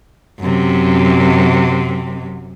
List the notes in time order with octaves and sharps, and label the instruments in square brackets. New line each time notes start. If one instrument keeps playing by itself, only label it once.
[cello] F#2 C3